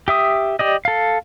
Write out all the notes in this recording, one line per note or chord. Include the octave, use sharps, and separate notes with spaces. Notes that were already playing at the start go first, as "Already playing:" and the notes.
G4 E5 D#6
G4 D5 D#5
A4 F5